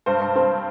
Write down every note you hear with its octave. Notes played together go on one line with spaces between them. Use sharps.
G2 C5
G2
C4